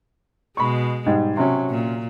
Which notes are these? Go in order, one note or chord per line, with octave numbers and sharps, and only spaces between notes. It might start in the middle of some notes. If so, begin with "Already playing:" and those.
B2 G#3 B5 C#6
G#2 G3
C3 F#3 C#4
A#2